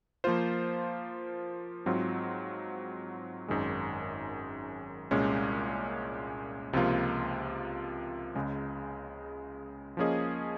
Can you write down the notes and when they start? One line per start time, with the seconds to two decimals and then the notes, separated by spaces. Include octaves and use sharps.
0.24 F3 A#3 F4 C5
1.86 G#2 F#3 C4 F4
3.48 G#1 F#2 D#3 G#3
5.11 C2 A#2 G#3 C#4
6.73 C#2 C3 F3 A#3 F4
8.35 C#2 C#3 G#3
9.97 F3 A#3 C#4 G#4 D#5